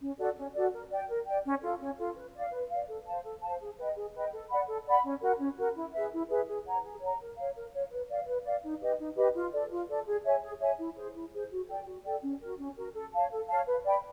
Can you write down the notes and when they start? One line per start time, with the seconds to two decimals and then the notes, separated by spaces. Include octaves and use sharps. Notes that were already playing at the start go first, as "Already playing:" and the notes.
0.01 C#4
0.18 F#4 A4 D5
0.37 C#4
0.54 F#4 A4 D5
0.73 A#4
0.91 D5 G5
1.08 A#4
1.26 D5 G5
1.45 C#4
1.62 F4 A4
1.80 C#4
1.98 F4 A4
2.16 B4
2.34 D5 F5
2.52 B4
2.70 D5 F5
2.88 A4
3.06 C5 F5 A5
3.24 A4
3.42 C5 F5 A5
3.60 G#4
3.79 B4 D#5 G5
3.96 G#4
4.14 B4 D#5 G5
4.32 A4
4.50 D5 F#5 B5
4.67 A4
4.86 D5 F#5 B5
5.04 C#4
5.22 F#4 A#4
5.40 C#4
5.57 F#4 A#4
5.76 E4
5.94 G#4 B4 E5
6.12 E4
6.30 G#4 B4 E5
6.47 G#4
6.66 C#5 F#5 A#5
6.84 G#4
7.01 C#5 F#5 A#5
7.20 A#4
7.37 C#5 F5
7.55 A#4
7.73 C#5 F5
7.91 B4
8.09 D5 F5
8.27 B4
8.45 D5 F5
8.63 D#4
8.81 G4 B4 D#5
8.99 D#4
9.17 G4 B4 D#5
9.35 F4
9.53 A4 D5
9.71 F4
9.89 A4 D5
10.07 G#4
10.25 C#5 E5 G#5
10.43 G#4
10.61 C#5 E5 G#5
10.79 E4
10.97 G#4 C5
11.15 E4
11.33 G#4 C5
11.51 F#4
11.68 A4 D5 G5
11.86 F#4
12.05 A4 D5 G5
12.22 C#4
12.40 F#4 A#4
12.59 C#4
12.77 F#4 A#4
12.94 A4
13.13 C#5 F5 A5
13.31 A4
13.48 C#5 F5 A5
13.66 B4
13.84 D5 G5 B5